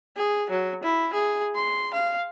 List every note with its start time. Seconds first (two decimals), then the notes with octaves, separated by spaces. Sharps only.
0.17 G#4
0.50 F#3
0.83 E4
1.13 G#4
1.55 C6
1.93 F5